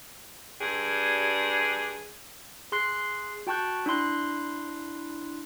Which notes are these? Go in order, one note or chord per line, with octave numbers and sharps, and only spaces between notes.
G2 G3 G#4
G#4 C6 F#6 C7
F#4 G5 A5 C#6 F#6 G6
D4 E4 C6 F#6